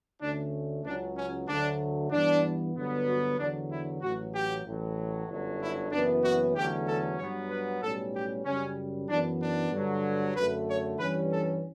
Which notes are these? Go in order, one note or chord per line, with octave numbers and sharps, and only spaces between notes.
D2 D3 A3 C#4 D4
C#2 C#3 F#3 C#4 D4
C#4
D2 D3 F#3 A3 D4
G2 E3 B3 D4
G2 D3 F#3 B3
F#4
E2 D3 F#3 D4
E4
A1 A2 F#3 F#4
G4
A1 A2 F#3
G1 F#2 D3 F#3
E4
F#1 F#2 E3 B3 D4
F#4
E2 D3 F#3 A3 C#4 G4
A4
G2 F#3 B3 C#5
B4
B1 A2 G3 C#4 A4
G4
F#2 C#3 G3 C#4
F#2 E3 B3 D4
D4
G2 D3 F#3
F#2 D3 A3 B4
C#5
G2 E3 G3 C#4 B4
A4